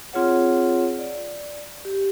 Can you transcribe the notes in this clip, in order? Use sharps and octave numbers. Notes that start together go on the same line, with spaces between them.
C4 F4 G#4 C#5 F#5
D5
G4